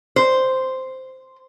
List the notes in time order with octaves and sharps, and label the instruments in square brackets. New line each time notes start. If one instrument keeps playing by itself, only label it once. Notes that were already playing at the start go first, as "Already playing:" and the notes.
[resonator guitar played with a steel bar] C5